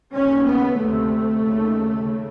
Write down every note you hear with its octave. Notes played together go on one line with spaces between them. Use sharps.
D#2 C#3 C#4
B3
D2 C3 A3
D#2 C#3
C#3